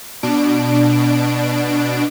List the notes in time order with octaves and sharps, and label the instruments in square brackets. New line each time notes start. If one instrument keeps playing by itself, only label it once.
[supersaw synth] B2 D4 D7